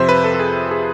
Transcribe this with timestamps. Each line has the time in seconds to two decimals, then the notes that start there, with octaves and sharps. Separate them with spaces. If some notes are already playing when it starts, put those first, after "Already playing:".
Already playing: F2 C3 F3 C5 E5
0.09 B4
0.24 A4
0.34 A4
0.40 G#4
0.71 G#4